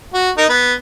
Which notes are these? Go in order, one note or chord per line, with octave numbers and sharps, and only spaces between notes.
F#4
D#4 A#4
B3